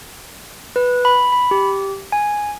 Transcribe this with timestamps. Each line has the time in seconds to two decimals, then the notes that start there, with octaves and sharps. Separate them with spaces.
0.76 B4
1.05 B5
1.32 B5
1.51 G4
2.12 G#5